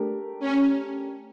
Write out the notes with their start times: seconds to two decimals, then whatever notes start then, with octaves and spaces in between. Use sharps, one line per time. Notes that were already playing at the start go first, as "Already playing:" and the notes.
Already playing: A3 D4 G4 A#4
0.40 C#4